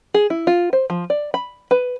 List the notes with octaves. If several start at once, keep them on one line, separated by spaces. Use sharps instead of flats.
G#4
E4
F4
C5
F3
D5
B5
B4